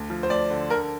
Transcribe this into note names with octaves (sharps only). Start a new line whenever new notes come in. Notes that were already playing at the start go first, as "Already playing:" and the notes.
Already playing: D2
F3
C5
D2 D5
D3
D3 A#4